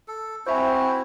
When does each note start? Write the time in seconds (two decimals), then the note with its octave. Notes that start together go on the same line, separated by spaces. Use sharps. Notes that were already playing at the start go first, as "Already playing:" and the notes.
0.08 A4
0.47 C4 E4 F#4 C5 E5 G#5